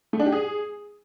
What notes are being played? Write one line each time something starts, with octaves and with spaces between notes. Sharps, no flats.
A3
D4
G4
G#4